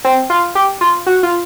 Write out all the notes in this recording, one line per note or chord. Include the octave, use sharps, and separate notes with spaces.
C4
F4
G4
F4
F#4
F4